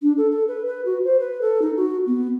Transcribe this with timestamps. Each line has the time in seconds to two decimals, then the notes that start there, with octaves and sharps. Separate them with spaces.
0.02 D4
0.17 A4
0.31 A4
0.48 B4
0.66 B4
0.85 F#4
1.04 C5
1.20 B4
1.41 A4
1.62 D#4
1.77 F#4
2.07 B3